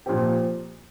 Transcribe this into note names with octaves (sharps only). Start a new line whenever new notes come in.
A#2 F3 C4 G4